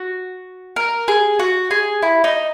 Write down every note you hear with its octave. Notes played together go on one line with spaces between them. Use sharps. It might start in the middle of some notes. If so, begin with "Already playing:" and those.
Already playing: F#4
A#4
G#4
F#4
G#4
E4
D#4